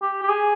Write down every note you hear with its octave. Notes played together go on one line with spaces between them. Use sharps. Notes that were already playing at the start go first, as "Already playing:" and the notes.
G4
G4
G#4